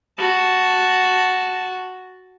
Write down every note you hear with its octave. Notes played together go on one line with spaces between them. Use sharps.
F#4 A5